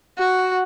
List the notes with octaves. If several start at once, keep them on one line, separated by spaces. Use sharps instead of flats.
F#4